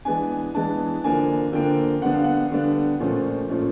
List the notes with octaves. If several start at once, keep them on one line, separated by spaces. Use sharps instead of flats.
E3 G#3 B3 D4 G#5
E3 G#3 B3 D4 A5
D3 F3 A#3 D4 G#5
D3 F3 A#3 D4 G5
D3 G3 B3 D4 F#5
F5
F#5
D3 G3 B3 D4
A#2 F3 A3 C#4
A#2 F3 A3 C#4